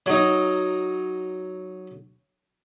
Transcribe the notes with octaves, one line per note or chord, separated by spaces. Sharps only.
F#3 D#4